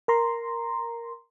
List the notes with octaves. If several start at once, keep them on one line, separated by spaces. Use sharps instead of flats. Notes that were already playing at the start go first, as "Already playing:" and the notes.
A#4 A#5 C6